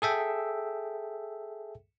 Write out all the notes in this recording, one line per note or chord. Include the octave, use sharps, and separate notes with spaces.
G#4 A4 E5 G5